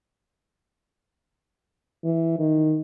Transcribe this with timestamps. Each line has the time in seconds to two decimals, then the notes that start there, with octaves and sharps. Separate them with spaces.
2.04 E3
2.39 D#3